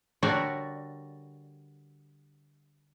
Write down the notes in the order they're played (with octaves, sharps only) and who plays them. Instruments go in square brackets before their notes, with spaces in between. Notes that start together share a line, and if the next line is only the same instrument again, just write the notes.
[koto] D3 G3 F#4 A#4 C#5 D5